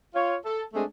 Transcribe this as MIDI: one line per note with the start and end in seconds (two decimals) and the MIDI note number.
0.15 0.34 65
0.15 0.34 73
0.44 0.63 69
0.74 0.84 56
0.74 0.84 57
0.74 0.84 60
0.74 0.84 62
0.74 0.84 68